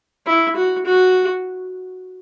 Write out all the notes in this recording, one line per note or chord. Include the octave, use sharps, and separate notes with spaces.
E4
F#4
F#4